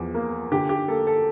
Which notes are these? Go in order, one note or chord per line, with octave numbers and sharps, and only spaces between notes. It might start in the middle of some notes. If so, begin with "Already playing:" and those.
Already playing: E2 F3
A#3
D3 G4
G4
A#3 A4
A4